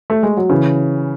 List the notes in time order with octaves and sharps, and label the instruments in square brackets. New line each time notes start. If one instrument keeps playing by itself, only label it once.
[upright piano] A3
G#3
F#3
C#3 E3